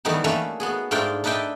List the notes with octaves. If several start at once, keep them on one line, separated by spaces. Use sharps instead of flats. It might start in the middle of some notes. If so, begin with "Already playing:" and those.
D#3 E3 G3 A3 B3 D#4
A3 A#3 C#4 A4 B4
B3 F#4 G#4
G#2 A3 D4 F4 A#4 G5
D4 D#4 B4 E5 G5 A5